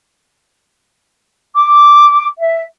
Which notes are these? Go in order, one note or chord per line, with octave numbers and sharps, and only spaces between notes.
D6
E5